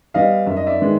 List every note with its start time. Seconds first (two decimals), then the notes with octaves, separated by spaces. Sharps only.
0.14 G3 B3 D#5 F5
0.46 F#2 E5
0.56 D#5
0.66 D5 E5
0.80 D#3 G#3 B3